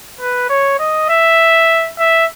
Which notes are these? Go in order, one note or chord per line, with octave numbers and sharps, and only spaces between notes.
B4
C#5
D#5
E5
E5